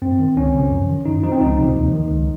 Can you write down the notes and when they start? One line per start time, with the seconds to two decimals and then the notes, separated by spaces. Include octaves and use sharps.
0.02 F#2 C4
0.19 D#3
0.36 C#2 C#4
0.54 C#3 F3
0.71 F#2
0.89 D#3
1.06 F#2 D#4
1.23 F3 D#4
1.32 C4
1.41 C#2 D#4
1.59 C3 F3
1.76 D#2
1.93 D#3
2.11 C#2